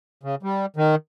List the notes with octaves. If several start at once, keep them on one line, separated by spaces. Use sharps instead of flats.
C#3
G3
D#3